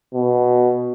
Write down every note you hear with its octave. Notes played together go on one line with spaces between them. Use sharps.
B2